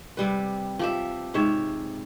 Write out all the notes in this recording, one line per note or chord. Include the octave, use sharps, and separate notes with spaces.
C3 G3 B4
F3 G4 E5
G#2 C3 C#5 E5